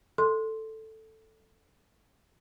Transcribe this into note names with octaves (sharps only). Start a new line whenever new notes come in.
A4 C6